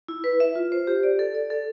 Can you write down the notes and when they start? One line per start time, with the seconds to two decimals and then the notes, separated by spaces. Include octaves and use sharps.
0.08 E4
0.24 B4
0.40 E5
0.55 F4
0.72 C5
0.87 G4
1.03 D5
1.19 A4
1.35 D5
1.50 A4